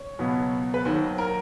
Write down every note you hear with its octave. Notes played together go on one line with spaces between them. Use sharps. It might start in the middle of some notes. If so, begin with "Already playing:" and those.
Already playing: C#5
C#2 B2 F#3 B3
B4
D#2 D#3 F#3 C5
A#4